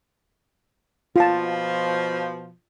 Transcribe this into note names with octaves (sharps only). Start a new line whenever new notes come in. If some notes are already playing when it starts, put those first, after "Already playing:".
B2 F3 F4 A5